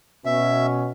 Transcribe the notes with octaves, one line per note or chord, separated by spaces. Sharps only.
B2 C#4 E5